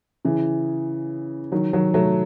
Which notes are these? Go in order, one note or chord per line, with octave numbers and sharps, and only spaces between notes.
C#3 E3
D#3 F#3
D#3 F#3
F#3 A3